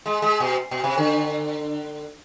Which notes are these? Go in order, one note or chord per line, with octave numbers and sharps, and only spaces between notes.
G#3
G#3
B2
B2
C3
D3